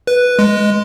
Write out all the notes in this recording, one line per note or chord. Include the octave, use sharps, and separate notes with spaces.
B4
G#3